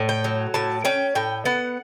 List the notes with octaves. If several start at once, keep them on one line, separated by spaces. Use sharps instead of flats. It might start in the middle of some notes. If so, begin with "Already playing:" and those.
Already playing: A2
G5
F#3
A2 A5
C#4 G5
A2 G5
B3 F#5